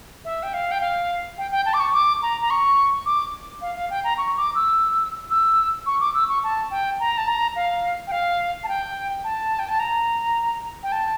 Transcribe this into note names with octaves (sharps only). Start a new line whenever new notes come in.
E5
G5
F5
G5
F5
G5
G5
A5
D6
C#6
D6
A#5
A#5
C#6
D6
F5
F5
G5
A#5
C#6
D6
E6
E6
C#6
D6
E6
C#6
A5
G5
A#5
A5
A#5
F5
G5
F5
A5
G5
A5
G5
A5
A#5
G5
A5